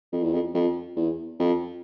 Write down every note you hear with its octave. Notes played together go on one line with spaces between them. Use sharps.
F2
E2
F2
F2
E2
F2